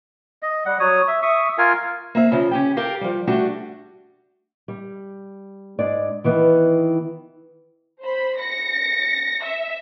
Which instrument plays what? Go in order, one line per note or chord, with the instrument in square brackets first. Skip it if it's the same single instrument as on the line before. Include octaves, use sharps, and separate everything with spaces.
[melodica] D#5
G3 F#5
F#3 C#5 D#6
E5
E5 C#6 D#6
F4 A#4 F5 G#5
[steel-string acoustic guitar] A#3 C4 E5
C#3 F3
C#4 G4 G5
G4 A4 A#4 F5
F3 G3
G3 A3 D4 F#4
[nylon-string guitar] G3
G#2 D4 D5
D#3 E3 B3
[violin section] C5 B5
A#6 C#7
E5